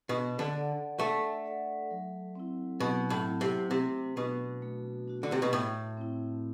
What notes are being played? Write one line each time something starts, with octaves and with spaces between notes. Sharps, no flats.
B2 D4
D3
A4 D5 F#5
A3 D4
A4 D5 F#5
F#3
C4 E4
B2 F#3
A2
C4 E4
C3
C3 A3
B2 D4 F#4
A3
D4 F#4
D3
C3
B2
A2 A3
C4 E4